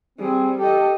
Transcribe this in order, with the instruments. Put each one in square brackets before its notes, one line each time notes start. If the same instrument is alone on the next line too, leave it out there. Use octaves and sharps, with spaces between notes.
[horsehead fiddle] G3 G#4 [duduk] C4
[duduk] G4 [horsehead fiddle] A4 D#5